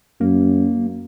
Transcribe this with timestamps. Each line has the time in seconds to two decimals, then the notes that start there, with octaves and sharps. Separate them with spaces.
0.21 F#2 A#3